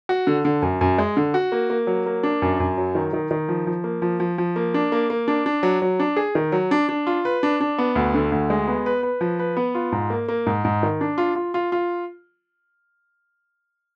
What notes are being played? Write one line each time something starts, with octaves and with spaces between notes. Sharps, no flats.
F#4
D3
D3
F#2
F#2
G#3
D3
F#4
A#3
A#3
F#3
A#3
D4
F#2
F#2
F#3
D#3
D#3
D#3
F3
F3
A#3
F3
F3
F3
A#3
D4
A#3
A#3
D4
D4
F#3
F#3
D4
G#4
D#3
F#3
D4
D4
F4
B4
D4
D4
B3
D2
D3
D2
G#3
B3
B4
B4
F3
B4
B3
F4
G#2
A#3
A#3
G#2
G#2
D#3
D4
F4
F4
F4
F4